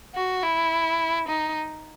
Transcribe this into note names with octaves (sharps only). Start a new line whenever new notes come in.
F#4
E4
D#4